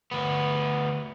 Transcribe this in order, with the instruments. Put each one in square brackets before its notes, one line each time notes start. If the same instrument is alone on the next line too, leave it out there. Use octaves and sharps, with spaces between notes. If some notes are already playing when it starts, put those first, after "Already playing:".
[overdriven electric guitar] D2 B3